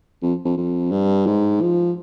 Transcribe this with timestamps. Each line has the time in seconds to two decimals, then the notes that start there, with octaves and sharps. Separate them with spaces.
0.22 F2
0.45 F2
0.58 F2
0.92 G2
1.27 G#2
1.61 F3